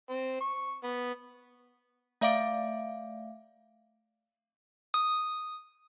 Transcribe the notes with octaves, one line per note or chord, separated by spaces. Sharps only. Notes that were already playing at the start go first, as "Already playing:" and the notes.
C4
C#6
B3
A3 D5 E5 F5 D6 D7
D#6